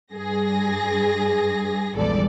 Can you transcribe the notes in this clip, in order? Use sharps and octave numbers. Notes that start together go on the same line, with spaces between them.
G2 G#4 A#6
A#1 E2 G2 G#3 A4 D5